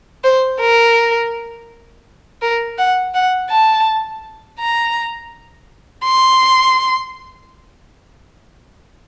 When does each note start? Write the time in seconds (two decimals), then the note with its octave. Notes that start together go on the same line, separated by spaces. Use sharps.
0.24 C5
0.61 A#4
2.42 A#4
2.78 F#5
3.15 F#5
3.51 A5
4.59 A#5
6.04 C6